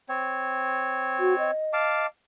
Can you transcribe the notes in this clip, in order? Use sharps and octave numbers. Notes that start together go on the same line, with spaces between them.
C4 C#5
F#4
D#5
F5 A5 D6